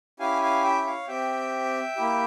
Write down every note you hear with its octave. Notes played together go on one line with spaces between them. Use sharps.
C#4 E4 G4 F5 G#5
F5 G#5
E5 G5
C#5 F5
C4 G4 E5 G5
A#3 E4 G4